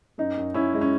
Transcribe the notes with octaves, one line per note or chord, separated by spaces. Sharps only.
F#2 D#4
F#2
F#2 C#4 E4
G#3
C#4